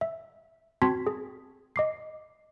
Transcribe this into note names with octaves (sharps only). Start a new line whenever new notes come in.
E5
C4 F#4 A5 C6 G#6 B6
G#4
D#5 D6 C7